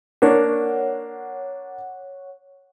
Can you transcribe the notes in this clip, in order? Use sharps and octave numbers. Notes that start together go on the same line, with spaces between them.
A#3 D4 C#5 F#5